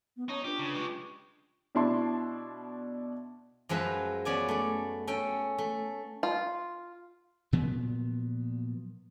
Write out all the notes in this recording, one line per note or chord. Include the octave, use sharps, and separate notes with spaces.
B3
C#4 D#4 C#5 A5
D4 F4 G4 B4
C#3
G#3 G4 C#6
B2 D4 E4 A5 C6
F#2 F3 G#3 B4 E5 F5
B3 C#4 D5 G#5
A3 D5
C#4 A4 G5
A3
F4
A#2 F3 F#3 B3